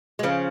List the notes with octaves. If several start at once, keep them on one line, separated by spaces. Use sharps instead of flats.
G#3
C#3 F3